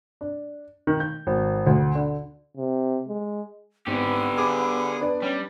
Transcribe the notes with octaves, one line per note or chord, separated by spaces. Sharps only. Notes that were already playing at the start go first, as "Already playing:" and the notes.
D4
D#3
G6
G#1
D2
D3
C3
G#3
G#1 D3 B3 G4
G#4 D6
D4 B4 D5
G3 C#4